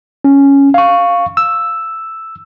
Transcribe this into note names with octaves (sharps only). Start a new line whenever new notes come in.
C#4
F5 C#6
E6